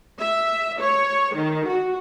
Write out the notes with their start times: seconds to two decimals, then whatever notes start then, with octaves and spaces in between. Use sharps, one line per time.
0.20 E5
0.81 C#5
1.35 D#3
1.68 F#4